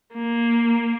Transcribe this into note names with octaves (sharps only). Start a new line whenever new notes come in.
A#3